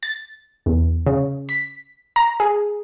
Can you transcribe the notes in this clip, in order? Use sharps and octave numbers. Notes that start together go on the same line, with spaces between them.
A6
E2
C#3
B6
A#5
G#4